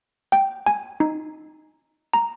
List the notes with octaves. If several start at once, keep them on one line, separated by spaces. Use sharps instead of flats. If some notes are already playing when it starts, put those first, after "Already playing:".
G5
G#5
D#4
A#5